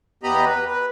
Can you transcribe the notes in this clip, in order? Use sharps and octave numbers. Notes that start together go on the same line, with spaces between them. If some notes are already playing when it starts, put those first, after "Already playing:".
E2 B3 G4 D#5 A#5 B5
B4
B4